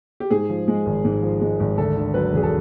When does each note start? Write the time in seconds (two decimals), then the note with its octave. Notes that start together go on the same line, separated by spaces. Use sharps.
0.20 G4
0.31 G#2 G#4
0.49 F3
0.68 G#3
0.86 G#1
1.05 G#2
1.22 F3
1.41 G#3
1.60 G#1
1.77 D2 A4
1.96 D3
2.14 F#3 B4
2.33 E1 G#4
2.43 A4